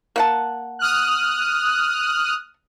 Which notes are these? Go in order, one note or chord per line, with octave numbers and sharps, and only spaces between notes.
A#3 F#5 A5
D#6 F6 F#6